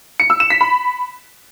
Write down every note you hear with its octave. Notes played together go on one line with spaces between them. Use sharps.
C#7
E6
E7
B6
B5